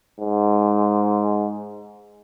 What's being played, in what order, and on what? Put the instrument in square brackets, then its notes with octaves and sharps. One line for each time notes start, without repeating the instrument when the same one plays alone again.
[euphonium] G#2